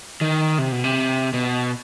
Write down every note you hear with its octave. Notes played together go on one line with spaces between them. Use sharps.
D#3
C3
B2
C3
B2